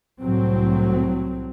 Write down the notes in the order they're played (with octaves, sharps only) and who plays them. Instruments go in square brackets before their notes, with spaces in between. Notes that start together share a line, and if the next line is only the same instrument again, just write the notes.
[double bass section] C2 A2 F#3 C4